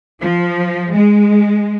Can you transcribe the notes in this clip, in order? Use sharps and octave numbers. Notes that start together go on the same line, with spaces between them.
F3
G#3